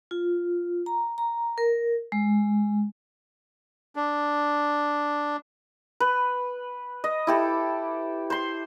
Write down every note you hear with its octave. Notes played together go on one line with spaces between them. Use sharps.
F4
A#5
A#5
A#4
G#3
D4
B4
D#5
E4 G4 A4
C5 C6